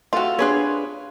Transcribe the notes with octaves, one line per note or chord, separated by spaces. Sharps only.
C3 A3 F4 F#4
D4 G#4 B4 C#5 C6 F#6